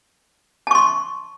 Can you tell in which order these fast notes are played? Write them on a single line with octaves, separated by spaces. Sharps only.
A5 C#6 C6